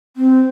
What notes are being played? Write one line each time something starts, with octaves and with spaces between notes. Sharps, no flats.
C4